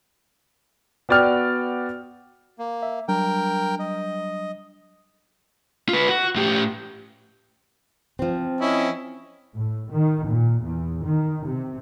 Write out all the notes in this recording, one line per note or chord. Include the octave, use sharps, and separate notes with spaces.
B3 F#4 D5 G5 F6
A#3
E5
F#3 G3 D4 A#4 G5
D#5
F4 B4
F#4
A2 G4
F3 C4
C#4 E4 D#5
A2
D#3
A#2
E2
D#3
C3